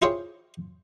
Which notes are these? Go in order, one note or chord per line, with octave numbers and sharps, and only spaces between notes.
E4 F4 G4 G#4 C5 C#5